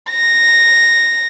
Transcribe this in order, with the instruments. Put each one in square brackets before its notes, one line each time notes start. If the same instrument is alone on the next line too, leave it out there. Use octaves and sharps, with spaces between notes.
[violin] A#6